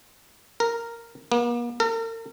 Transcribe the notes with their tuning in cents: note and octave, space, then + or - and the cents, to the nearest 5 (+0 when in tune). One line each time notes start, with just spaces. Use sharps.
A#4 -10
A#3 +45
A#4 -45